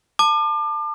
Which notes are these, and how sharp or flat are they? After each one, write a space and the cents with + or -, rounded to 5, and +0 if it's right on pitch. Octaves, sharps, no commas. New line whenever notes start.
A5 +15 D6 +35